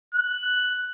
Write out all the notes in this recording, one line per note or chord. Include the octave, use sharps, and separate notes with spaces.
F#6